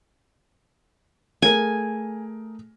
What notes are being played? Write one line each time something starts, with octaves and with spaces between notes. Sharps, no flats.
A3 G#4 A#4 G#5